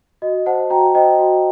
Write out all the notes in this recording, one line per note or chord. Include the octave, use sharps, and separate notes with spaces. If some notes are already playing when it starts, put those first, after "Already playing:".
F#4 D#5
C5 F#5 A5
F#4 G5 A#5
C5 D#5 G5
F#4